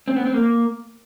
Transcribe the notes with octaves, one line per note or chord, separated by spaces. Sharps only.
C4
B3
C4
A#3